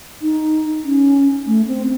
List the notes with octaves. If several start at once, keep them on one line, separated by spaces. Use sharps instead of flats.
D#4
C#4
A3
C4